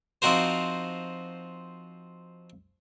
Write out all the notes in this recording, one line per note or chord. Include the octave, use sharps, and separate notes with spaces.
F3 C4 D#4 F#4 A#4 C5